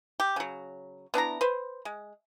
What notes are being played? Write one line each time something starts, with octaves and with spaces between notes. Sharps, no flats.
G4
C#3 F#3
B3 D4 E4 A#5
B4 C5
G#3